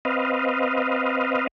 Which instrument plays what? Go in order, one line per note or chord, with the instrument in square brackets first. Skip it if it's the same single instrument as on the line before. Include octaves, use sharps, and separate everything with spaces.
[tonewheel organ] C4 B4 D#5 F5